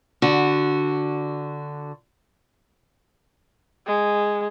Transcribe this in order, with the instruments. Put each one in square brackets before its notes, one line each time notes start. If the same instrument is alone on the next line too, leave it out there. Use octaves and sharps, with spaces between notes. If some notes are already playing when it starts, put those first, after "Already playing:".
[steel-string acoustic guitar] D3 F#4
[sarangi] G#3